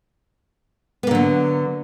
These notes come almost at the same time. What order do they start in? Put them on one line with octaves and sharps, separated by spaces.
B3 A#3 D3 F#3